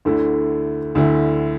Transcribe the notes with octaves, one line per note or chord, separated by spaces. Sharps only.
D2 D3 A3 E4
D2 D3 A3 E4